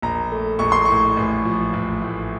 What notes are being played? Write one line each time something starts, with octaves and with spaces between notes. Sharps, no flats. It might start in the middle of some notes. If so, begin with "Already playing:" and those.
A#1 A#5
A3
A#1 C#6
C6
A2 C#6
A1
F3
A1
A2